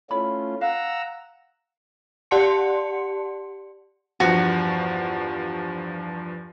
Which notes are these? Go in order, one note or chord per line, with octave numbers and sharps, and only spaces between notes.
A3 C#4 E4 F4 C#5 B5
F5 F#5 A#5 E6
G4 D5 F#5 A5 C6 C#7
E2 G2 F3 F#4